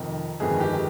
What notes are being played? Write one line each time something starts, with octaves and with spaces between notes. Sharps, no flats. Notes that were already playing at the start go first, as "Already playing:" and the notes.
Already playing: F1 F2 D#3
G1 F2 D#3 G#3 G#4
G4